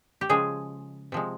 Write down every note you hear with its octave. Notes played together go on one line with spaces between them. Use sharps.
G4
C#3 F3 G#3 G#4
C3 F3 G#3